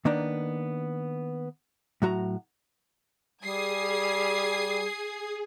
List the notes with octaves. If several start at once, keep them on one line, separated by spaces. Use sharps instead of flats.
D#3 A#3 B3 D4 D#4
A2 F#3 F#4 A#5
G3 G#4 D#6 G#6 C7